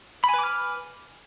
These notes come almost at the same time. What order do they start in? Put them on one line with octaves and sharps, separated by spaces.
B5 G#5 B4 D6 F6